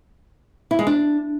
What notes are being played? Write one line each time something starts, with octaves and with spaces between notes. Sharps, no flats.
E4
G#3
D4